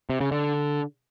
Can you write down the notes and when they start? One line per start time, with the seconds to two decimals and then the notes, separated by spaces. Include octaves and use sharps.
0.10 C3
0.20 C#3
0.31 D3